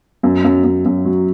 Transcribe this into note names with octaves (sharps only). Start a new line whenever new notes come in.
F#2
F#2
F#2
F#2
F#3